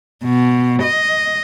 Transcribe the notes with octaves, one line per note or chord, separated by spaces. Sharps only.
B2
D#5